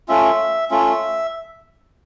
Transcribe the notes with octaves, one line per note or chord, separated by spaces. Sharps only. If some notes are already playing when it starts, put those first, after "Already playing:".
A3 C#4 F4 E5
A3 C#4 F4 E5